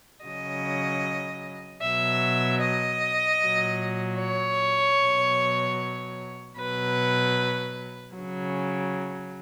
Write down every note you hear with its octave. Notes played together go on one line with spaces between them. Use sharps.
C#3 F#3 D#5
B2 F#3 E5
D#5
A#2 F#3
C#5
B2 F#3
B2 F#3 B4
C#3 F#3